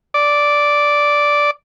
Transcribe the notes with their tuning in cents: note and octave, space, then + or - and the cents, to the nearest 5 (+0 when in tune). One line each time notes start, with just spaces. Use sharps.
D5 -5